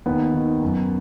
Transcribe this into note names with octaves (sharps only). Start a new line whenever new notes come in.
D#2 B3
D#3
F#2